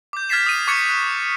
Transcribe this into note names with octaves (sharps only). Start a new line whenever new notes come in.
D6 G6
F6 G#6 A6 B6 C7 E7
D#6 D#7
C#6 D6 F#6 G#6 A6 C#7
F#6